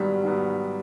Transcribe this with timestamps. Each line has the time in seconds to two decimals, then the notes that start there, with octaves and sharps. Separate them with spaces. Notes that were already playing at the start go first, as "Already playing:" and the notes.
Already playing: G#2 D#3 F#3 G3 B3
0.24 G#2 D#3 F#3 B3